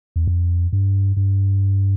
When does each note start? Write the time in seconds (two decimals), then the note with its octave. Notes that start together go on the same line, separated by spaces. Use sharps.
0.16 E2
0.27 F2
0.73 G2
1.16 G2